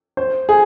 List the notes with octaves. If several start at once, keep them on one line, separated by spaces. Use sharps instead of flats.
C5
G#4